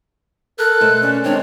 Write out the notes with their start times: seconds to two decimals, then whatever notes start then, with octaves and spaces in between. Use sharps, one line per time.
0.59 A4 A#4 F#6
0.81 B2 A3 C5
1.02 C#4 D5
1.25 D#3 G#3 C4 D4 C#5